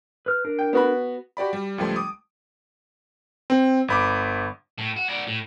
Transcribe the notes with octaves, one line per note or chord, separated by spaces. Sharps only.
B4 F6
D4 A#4
G5
B3 F#4 B5
F#4 G4 D5 B5
G3
C#2 F3 G3 A3 A5 C6
D6 D#6
C4
G1 B5 D6
A2
F#4
F#4 D5
A2